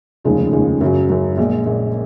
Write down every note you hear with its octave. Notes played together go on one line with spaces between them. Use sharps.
F1 D#2 C#3 F3 G#3
F1 D#2 C#3 F3 G#3
F#2 C#3 F#3
F#2 C#3 F#3
A#1 A#2 G#3
A#1 A#2 G#3